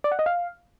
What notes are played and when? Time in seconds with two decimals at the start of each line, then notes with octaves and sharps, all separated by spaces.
0.04 D5
0.12 F#5
0.19 D#5
0.26 F5